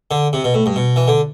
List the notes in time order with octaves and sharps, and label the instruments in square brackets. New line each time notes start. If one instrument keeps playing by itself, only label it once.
[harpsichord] D3
C3
B2
A2
G2
B2
E3
D3